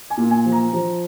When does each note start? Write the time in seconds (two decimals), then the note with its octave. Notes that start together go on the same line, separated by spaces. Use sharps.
0.10 G#5
0.18 A#2
0.31 G#5
0.45 F3
0.52 A#5
0.73 F3